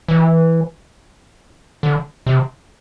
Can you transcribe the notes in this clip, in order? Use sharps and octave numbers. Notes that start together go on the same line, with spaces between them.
E3
D3
C3